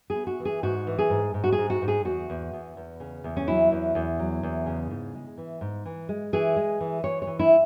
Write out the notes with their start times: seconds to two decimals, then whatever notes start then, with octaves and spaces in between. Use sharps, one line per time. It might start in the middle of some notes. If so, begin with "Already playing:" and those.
0.10 G#4
0.16 B3
0.27 F#4
0.40 E3
0.45 G#4
0.63 G#2 F#4
0.87 E3
0.98 G#4
1.10 G#2
1.34 G#2
1.44 F#4
1.52 G#4
1.58 G#2
1.70 F#4
1.82 G#2
1.88 G#4
2.05 E2 F#4
2.30 E2
2.53 E2
2.77 E2
3.00 C#3
3.24 E2
3.37 C#4
3.47 F#3 E4
3.71 E2
3.95 E2
4.19 F#3
4.43 E2
4.66 C#3
4.90 G#2
5.14 G#3
5.38 E3
5.61 G#2
5.85 E3
6.09 G#3
6.33 E3 G#4
6.56 G#3
6.80 E3
7.04 E3 C#5
7.22 C#5
7.27 E3
7.39 E4